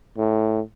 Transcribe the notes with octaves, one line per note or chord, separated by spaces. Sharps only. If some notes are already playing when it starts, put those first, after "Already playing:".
A2